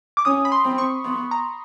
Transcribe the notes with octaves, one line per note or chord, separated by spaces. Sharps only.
D6
C#4 D#6
B5
C6
C4
C#6
B3
A#5